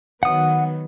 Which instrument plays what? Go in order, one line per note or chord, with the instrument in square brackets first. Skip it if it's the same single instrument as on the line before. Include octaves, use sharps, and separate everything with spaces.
[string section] D#3 F#3 B3 [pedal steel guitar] F#5 D#6